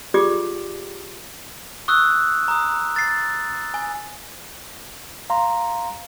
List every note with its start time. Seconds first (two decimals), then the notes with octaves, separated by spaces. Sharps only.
0.14 F4 G4 G#4 D5 D6 D#6
1.88 C#6 D#6 E6 F#6
2.48 A#5 D#6
2.96 A6 C7
3.74 G#5
5.30 F5 A#5 C6